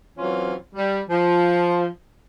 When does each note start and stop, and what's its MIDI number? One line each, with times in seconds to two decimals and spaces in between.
0.18 0.53 52
0.18 0.53 54
0.18 0.53 60
0.18 0.53 61
0.18 0.53 65
0.75 0.99 55
1.09 1.85 53